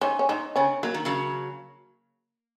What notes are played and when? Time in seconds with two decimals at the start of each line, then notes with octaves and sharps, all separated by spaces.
0.01 G#2 C#4
0.19 C#4
0.29 G#2 D#4
0.56 C#3 C#4
0.83 F#3 A#3
0.94 D#3
1.05 C#3 F#3